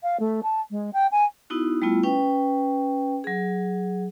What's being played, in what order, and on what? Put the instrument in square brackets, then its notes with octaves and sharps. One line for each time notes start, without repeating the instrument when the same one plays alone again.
[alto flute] F5
A3
A5
G#3
G5
G#5
[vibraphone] B3 D#4 E4 F#4
G3 A3 B3 E4 F4
C#4 B4 G5
F#3 G#4